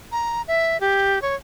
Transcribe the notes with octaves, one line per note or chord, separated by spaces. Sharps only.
A#5
E5
G4
C#5